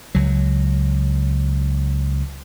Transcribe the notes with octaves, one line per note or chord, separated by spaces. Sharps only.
C#2 F#3